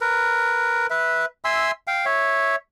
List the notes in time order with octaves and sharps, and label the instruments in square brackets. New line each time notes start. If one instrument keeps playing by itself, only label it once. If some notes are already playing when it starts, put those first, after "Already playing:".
[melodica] A#4 B4
B4 E5
E5 G#5 C6 E6
F5 G5
C#5 E5